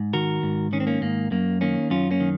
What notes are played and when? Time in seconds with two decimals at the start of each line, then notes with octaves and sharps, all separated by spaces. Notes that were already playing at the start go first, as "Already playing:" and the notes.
Already playing: G#2
0.13 D#3 F#4 A#4
0.43 G#2
0.73 D#3 C#4
0.80 C4
0.87 A#3 C#4
1.02 G#2 A#3
1.31 F#2 A#3
1.61 D#3 A#3 C#4
1.90 F#2 C#4 F4
2.11 A#3 C#4
2.20 D#3